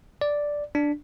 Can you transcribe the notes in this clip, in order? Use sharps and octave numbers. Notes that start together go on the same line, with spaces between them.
D5
D4